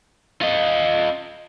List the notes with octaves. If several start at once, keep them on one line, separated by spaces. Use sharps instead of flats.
F4 D#5